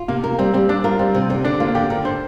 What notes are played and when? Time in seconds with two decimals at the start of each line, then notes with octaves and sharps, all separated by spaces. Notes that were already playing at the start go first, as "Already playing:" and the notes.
Already playing: F4
0.08 C3 A#3
0.23 A#3 A#4
0.39 G3 C4
0.54 G3 C4
0.69 G3 D4
0.84 F4 A#4
0.99 G3 C4
1.14 C3 C4
1.30 D3 C4
1.44 D3 D4
1.60 A#3 F4
1.75 D3 G4
1.90 D3 A#4
2.05 D4 C5